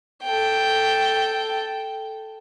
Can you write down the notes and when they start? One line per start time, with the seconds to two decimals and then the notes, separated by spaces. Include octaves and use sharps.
0.24 A4 G5